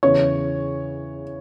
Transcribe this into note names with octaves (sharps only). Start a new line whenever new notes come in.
E2 C#3 E3 C#5